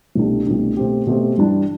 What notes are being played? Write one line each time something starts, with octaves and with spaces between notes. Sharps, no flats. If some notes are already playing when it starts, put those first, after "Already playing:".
C2 B2 A3 D4 G4
C2 B2 A3 D4 G4
B2 A3 C4 G4
B2 A3 C4 G4
G2 E3 G3 D4